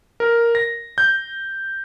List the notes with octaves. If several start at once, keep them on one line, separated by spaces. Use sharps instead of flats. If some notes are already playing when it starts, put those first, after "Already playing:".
A#4
A#6
G6